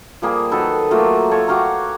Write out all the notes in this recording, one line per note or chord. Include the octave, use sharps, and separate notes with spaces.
F3 G3 A#3 G#4
D#3 F#3 A4 B4
F#3 A3 A#3 F4
A3 C#5
F#4 G4 F5 A#5